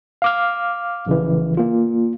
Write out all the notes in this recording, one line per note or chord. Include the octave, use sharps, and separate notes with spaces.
F5 D6 F6
A#1 C#3 E3
A#3 F4